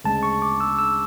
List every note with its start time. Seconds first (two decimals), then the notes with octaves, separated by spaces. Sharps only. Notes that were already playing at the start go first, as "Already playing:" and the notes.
0.04 D2 C#3 G#3 A5
0.23 C#6
0.42 D6
0.60 E6
0.79 E6